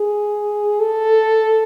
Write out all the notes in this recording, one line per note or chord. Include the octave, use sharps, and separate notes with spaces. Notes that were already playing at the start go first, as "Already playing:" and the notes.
Already playing: G#4
A4